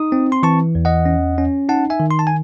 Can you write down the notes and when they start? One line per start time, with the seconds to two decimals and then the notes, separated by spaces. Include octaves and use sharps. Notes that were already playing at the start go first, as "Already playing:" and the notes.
Already playing: D#4 D#6
0.12 C4
0.32 C6
0.43 E3 A5 C#6
0.75 E2
0.85 D#5 F#5
1.06 C#4
1.38 C#4
1.69 D#4 F#5 A5
1.90 E5 G#5
2.00 D#3
2.11 C6
2.19 A5
2.27 G#5